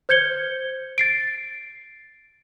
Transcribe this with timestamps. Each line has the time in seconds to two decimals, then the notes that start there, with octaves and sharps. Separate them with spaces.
0.09 C5 G6 G#6 C#7 G7
0.98 A6 C7 D7